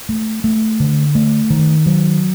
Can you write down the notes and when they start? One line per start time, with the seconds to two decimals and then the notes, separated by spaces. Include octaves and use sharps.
0.09 A3
0.44 A3
0.80 D3
1.15 A3
1.50 D#3
1.86 F#3